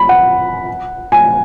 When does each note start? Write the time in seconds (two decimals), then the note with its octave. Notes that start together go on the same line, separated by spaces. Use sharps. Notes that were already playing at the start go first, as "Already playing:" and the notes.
Already playing: B5
0.09 F#5
1.12 G#5